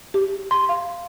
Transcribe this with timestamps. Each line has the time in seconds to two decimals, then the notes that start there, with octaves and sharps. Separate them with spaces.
0.14 G4
0.51 C6
0.69 F5